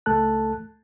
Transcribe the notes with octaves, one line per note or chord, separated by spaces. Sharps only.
C#2 A3 A4 A5 F#6